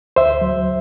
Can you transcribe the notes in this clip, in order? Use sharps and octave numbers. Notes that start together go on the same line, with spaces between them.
D2 C5 E5
F#3